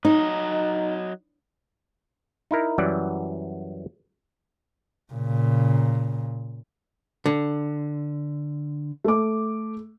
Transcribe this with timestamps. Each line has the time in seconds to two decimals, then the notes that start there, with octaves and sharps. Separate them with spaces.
0.05 F#3 D#4 D#5
2.51 D#4 E4 A#4
2.78 F#2 E3 F#3 G3 D5 F#5
5.13 A#2 C#3
7.26 D3
9.04 A3 D6